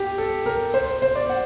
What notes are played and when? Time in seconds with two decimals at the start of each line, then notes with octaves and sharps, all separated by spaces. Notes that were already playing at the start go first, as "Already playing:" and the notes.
Already playing: G4
0.18 A4
0.46 A#4
0.74 C5
0.88 C5
1.02 C5
1.16 D5
1.30 F#5